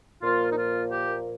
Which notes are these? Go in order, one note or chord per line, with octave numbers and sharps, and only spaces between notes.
A#2 F3 A#3 F4
D#4
F4
G4